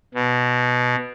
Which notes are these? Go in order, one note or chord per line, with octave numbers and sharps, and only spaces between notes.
B2